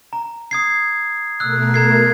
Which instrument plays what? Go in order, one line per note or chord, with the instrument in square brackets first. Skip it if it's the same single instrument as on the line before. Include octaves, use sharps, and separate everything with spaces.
[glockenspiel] A#5
D#6 G#6 C7
[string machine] B2 A3 A#4 [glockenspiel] E6 F#6
[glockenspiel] A#5 G#6 C7